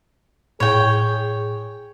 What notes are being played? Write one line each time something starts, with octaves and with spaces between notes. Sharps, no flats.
A2 G#4 C#5 G5